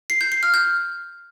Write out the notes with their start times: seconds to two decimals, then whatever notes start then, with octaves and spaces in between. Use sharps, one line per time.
0.10 C7
0.21 G6
0.32 C7
0.43 F6
0.54 G6